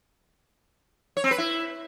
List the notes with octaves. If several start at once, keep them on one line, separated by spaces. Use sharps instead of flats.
C#5
C4
B4
E4